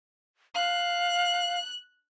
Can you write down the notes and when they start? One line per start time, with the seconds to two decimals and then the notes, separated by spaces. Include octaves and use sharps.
0.55 F5 F#6